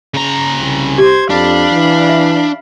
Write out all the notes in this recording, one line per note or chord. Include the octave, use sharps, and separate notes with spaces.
C#3 A#5
C2
G4 C5 G#6
F2 D4 F5 B5
E3
E5